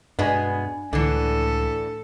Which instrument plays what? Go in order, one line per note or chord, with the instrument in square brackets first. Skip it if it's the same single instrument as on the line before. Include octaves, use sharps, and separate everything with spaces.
[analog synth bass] G2 [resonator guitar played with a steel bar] B2 G#3 B3 [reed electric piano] D4 G#5
[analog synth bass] C#2 [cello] A2 A4 [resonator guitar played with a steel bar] D3 E3